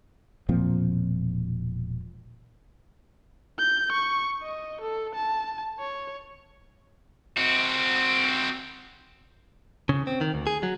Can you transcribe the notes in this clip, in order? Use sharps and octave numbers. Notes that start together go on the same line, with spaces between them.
E1 A#2 F3 C4
G6
C#6
D#5
A4
A5
C#5
C4 F#4
C#3
C4
D#3
D2
G#4
F#3